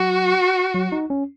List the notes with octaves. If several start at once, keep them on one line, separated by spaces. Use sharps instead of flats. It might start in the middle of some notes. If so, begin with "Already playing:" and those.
Already playing: F#3 F#4
F#3
D#4
C#4